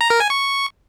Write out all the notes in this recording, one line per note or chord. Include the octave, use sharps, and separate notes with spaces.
A#5
A#4
G#5
C#6